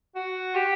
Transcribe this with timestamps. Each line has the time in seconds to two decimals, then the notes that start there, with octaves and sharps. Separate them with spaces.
0.16 F#4
0.55 G4